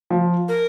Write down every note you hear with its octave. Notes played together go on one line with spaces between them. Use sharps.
F3
A#4